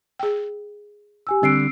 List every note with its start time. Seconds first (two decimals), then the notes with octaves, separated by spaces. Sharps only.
0.19 G#4 G5
1.27 G4 G#5 E6
1.43 D3 G3 C4 E6 C7 D7